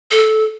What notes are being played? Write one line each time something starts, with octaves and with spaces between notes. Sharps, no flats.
A4